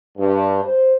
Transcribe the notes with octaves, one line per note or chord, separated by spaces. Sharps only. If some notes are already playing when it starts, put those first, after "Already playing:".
G2
C5